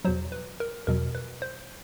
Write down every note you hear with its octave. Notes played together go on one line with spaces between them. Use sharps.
E2 B2 F#3 C5
B4
A#4
E2 B2 F#3 A#4
B4
C5